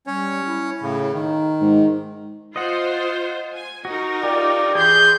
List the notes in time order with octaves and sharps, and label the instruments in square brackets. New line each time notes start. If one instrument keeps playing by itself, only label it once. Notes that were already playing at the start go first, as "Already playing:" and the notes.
[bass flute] G3 [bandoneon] C#4 C#5
[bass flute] E4
[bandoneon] A2 C#3
[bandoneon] D#3 [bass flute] D#4
[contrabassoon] G#2
[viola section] F4 C5 [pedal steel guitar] D#5 F#5
[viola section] G#5
[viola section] D#4 A#4 [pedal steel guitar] F#4
[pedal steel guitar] F4 [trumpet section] G4 D5
[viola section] E3 C6 [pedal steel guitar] G#4 [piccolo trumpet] G6